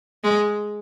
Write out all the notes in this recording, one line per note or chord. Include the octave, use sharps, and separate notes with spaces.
G#3